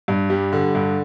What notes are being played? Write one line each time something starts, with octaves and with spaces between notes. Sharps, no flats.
G2
G3
D3
G2